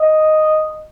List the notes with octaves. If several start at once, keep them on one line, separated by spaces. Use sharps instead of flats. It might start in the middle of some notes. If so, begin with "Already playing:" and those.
Already playing: D#5